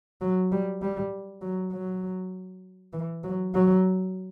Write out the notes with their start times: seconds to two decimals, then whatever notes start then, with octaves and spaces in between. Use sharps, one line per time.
0.21 F#3
0.52 G3
0.82 G3
1.42 F#3
1.72 F#3
2.94 E3
3.24 F#3
3.54 F#3